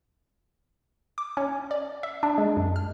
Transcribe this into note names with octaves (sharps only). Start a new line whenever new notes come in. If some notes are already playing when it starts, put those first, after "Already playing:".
D6
C#4
D5
E5
D4
G#3
F#2
F6